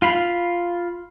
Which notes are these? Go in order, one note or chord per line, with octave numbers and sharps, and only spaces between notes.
F4 F5 B5